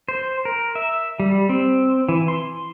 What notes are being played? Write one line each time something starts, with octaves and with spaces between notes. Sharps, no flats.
C5
A#4
E5
G3
C4
E3
C6